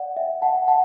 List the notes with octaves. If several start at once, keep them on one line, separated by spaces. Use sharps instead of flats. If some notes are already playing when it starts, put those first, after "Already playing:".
Already playing: D5 F#5
E5 G5
F#5 A5
F#5 A5